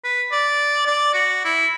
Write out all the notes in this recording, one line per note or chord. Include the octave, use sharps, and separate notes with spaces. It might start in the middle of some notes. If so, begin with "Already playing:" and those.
B4
D5
D5
F#4
E4